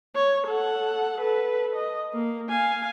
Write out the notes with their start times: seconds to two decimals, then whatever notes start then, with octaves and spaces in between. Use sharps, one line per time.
0.16 C#5
0.47 A4 F#5
1.18 A4 B4
1.76 D#5
2.14 A#3
2.50 F5 G#5